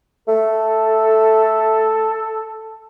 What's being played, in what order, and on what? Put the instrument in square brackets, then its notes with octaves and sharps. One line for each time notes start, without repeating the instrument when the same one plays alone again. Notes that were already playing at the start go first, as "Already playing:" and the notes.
[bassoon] A3 [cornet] A4